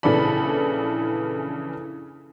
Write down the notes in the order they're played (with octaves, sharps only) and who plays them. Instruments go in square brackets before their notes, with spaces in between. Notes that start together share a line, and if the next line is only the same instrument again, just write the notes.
[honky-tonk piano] A#1 C#3 E3 A4 D5 B5